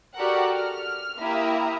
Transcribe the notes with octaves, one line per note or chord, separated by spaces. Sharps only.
F#4 G4 A4 A#4 D5 F#5
F6
A#3 E4 G4 E5 A#5 D#6